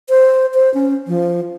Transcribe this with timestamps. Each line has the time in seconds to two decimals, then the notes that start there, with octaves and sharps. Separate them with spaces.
0.09 C5
0.54 C5
0.74 C#4
1.07 F3